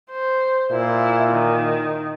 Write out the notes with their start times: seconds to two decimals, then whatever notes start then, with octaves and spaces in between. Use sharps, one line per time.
0.11 C5
0.72 A#2 E4
1.31 D#3